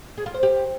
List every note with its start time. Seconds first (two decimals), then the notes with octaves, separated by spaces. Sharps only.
0.18 G#4
0.26 F4
0.34 C5
0.43 G4